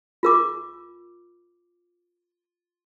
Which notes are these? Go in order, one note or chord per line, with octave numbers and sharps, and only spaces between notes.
F4 A#4 D6